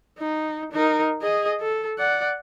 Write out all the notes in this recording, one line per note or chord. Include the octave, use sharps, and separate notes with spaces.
D#4
D#4 A#4
G#4 D#5
A4
D5 F#5